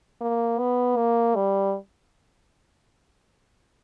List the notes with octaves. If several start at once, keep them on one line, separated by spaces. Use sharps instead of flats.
A#3
B3
A#3
G3